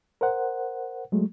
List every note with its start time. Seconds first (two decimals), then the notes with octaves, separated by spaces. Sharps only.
0.21 A#4 C5 F#5
1.12 F#3 G#3 A3